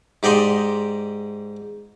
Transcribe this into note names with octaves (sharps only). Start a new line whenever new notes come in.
G#2 G4 D5 D#5 C6